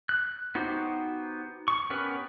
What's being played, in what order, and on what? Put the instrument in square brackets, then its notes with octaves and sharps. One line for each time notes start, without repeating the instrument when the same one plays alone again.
[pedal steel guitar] F#6
B3 D#4 F#4 G4 C5
C#6
B3 C#4 G4 A#4 B4